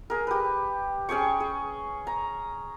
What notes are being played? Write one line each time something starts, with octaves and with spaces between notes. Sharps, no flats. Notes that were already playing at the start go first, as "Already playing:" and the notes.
G#4 A#4
G4 B4
C#4 G#4 G5 C#6
G#4
A#5